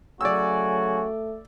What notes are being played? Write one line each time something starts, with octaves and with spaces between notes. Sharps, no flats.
C#3 F#3 A3 F#4 D5 G#5 E6